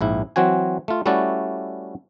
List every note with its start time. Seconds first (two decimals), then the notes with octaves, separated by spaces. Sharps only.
0.01 A#1 G#2 E4
0.36 E3 F#3 C4 F#4 G#5
0.88 A3 F4
1.06 G3 A3 C#4 E4 F#4 D5